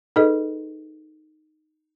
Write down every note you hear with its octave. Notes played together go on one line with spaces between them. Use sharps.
D#4 G#4 A4 B4 D#5